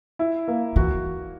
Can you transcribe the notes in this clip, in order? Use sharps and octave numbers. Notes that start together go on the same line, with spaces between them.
E4
A#3
E3 F#4